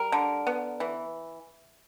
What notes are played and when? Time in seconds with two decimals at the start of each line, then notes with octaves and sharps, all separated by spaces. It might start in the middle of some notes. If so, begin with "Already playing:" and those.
Already playing: G3 A#4
0.12 D3
0.47 B3
0.80 E3